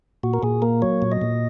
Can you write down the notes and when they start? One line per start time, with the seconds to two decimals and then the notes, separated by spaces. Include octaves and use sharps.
0.23 A#2 F#4
0.34 A#4
0.43 A#2 G#4
0.62 A#3 A#4
0.82 F#3 C#5
1.02 A#2
1.12 D#5
1.22 A#2